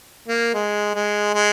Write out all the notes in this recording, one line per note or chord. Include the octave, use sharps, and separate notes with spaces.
A#3
G#3
G#3
G#3